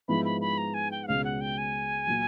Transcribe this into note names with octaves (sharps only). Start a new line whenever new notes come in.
G#2 F3 G#3 B3 E4 B5
B5
B5
A#5
G#5
G5
F#5
C#2 B2 G#3 C#4 F5
F#5
G5
G#5
A#2 F#3